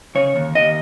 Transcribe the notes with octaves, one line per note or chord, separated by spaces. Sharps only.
C#3 C#5
D#2
D#2 D#5